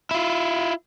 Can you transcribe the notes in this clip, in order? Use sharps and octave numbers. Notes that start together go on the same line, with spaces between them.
E4 F4